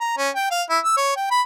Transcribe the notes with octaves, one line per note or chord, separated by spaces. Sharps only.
A#5
C#4
G5
F5
E4
E6
C#5
G5
B5